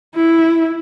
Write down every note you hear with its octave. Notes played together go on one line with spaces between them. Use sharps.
E4